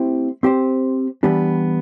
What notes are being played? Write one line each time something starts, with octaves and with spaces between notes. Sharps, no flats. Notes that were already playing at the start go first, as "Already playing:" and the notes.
Already playing: A3 C4 E4 G4 C5
C4 G4 C5
E3 G3 B3 D4 G4